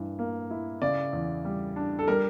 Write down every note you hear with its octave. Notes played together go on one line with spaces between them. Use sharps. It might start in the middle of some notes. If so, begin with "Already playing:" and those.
Already playing: G2 E3
A#3
E4
C#3 D5
E2
G3
D4
A4
G3 A#4